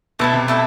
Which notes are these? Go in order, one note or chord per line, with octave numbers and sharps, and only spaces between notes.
B2 A3 E4 A4
C3
A3 E4 A4